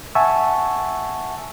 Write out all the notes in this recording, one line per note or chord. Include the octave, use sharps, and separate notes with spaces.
E5 F#5 G#5 A5 C#6 E6